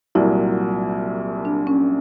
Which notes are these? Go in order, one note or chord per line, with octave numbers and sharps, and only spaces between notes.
C2 A#2 F#3 E4
D4
C#4